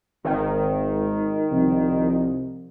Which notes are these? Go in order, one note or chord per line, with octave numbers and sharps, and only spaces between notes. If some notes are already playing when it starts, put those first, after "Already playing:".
G#1 D#3
C2 C3 F3